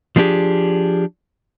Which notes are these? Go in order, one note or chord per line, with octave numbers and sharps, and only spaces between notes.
F3 G#3 A3 D4 G4 G#4